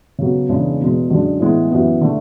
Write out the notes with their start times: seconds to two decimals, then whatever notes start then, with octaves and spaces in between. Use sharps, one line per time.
0.19 C#3 F#3 B3
0.49 E2 C#3 G#3 D4
0.80 E2 B2 G#3
1.10 F#2 D3 G#3 D4
1.40 A2 E3 G#3 B3
1.71 F#2 E3 B3
2.01 D3 A3